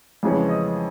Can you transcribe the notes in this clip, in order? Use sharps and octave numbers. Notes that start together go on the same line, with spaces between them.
F2 C#3 E3 G#3 C#4
D#5